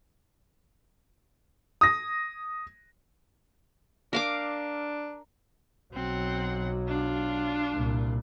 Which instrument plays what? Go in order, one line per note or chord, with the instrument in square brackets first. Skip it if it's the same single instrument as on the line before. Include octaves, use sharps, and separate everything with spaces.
[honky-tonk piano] D#6 A#6
[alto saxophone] D4 [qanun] A#4 F5 D6
[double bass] B1 F#3 [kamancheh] C4 F#5
[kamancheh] D4 F4
[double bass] C2 A#2